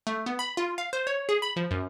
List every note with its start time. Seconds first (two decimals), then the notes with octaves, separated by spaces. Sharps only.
0.07 A3
0.26 B3
0.39 B5
0.57 F4
0.78 F5
0.93 C5
1.07 C#5
1.29 G#4
1.42 B5
1.56 F3
1.71 F#2